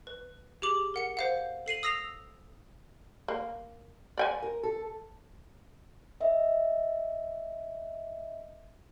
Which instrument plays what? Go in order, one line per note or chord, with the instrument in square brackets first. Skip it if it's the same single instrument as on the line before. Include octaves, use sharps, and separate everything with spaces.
[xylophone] B4
G4 G#4 D6 F#7
A#4 F#5 C#7
C5 F5 F#5
A4 C7 D#7 F#7
D#6 E6 A#6 C7 F7
[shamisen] A#3
D5 G5 G#5
[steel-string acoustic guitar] A#4
A4
[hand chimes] D#5 E5